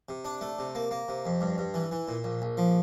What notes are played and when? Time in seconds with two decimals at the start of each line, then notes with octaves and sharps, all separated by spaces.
0.09 C3
0.25 D4
0.41 A3
0.59 C3
0.75 A#3
0.91 A#3
1.08 C3
1.26 F2
1.41 G2
1.58 G2
1.74 E3
1.91 E3
2.08 A#2
2.24 A#1
2.42 A#1
2.57 F3